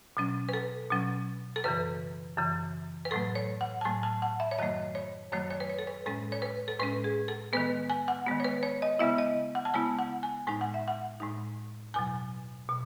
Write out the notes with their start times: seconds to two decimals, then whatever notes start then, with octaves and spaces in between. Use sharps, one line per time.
0.17 B2 F#3 C#4
0.49 B4
0.53 A4
0.90 B2 F#3 C#4
1.56 A4
1.64 F#2 C#3 E3 B4
2.38 F#2 C#3 E3
3.05 B4
3.11 A2 F#3 A3 A4
3.35 C#5
3.61 F#5
3.81 A5
3.85 A2 F#3 A3 G#5
4.03 A5
4.22 F#5
4.40 E5
4.51 C#5
4.59 F#2 D#3 F#3 A3 D#5
4.95 C#5
5.32 F#2 D#3 F#3 A3 C#5
5.51 C#5
5.60 B4
5.70 C#5
5.79 A4
5.87 B4
6.06 A2 G#3 C#4 A4
6.32 C#5
6.42 B4
6.68 A4
6.79 A2 G#3 C#4 B4
7.04 G#4
7.28 A4
7.53 D#3 G#3 B3 B4
7.90 G#5
8.08 F#5
8.26 D#3 G#3 B3
8.40 C#5
8.44 B4
8.63 C#5
8.82 D#5
8.99 C#3 G#3 B3 E4 E5
9.18 D#5
9.55 F#5
9.65 A5
9.74 C#3 G#3 B3 E4 G#5
9.99 F#5
10.23 G#5
10.47 A2 G#3 D#4 G#5
10.61 F#5
10.74 E5
10.88 F#5
11.20 A2 G#3 D#4
11.94 E2 B2 F#3 G#5
12.69 B2